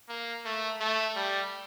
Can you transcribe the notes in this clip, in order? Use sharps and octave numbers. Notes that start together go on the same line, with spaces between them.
A#3
A3
A3
G3